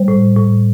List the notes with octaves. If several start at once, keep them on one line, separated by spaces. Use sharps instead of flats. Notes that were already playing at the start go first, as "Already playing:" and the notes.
Already playing: G3 C5
A2
A2